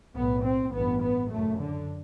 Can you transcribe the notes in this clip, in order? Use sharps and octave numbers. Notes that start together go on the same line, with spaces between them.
B1 A2 B3
C4
A1 G2 B3
B3
F#1 F#2 A3
D3